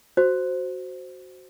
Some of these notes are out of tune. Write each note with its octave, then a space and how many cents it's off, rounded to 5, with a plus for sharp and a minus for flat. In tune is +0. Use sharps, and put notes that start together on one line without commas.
F#4 +0 C5 +0